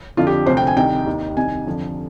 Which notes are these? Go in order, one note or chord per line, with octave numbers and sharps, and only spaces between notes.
F2 D3 F3 F4
G4
D2 C3 F3 C5
G5
G#5
C2 C3 D#3 G5
D#2 D#3
C2 C3 D#3 G#5
F2 D3 F3